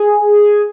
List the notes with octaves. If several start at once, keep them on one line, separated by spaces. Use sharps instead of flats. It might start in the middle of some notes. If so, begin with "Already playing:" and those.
Already playing: G#4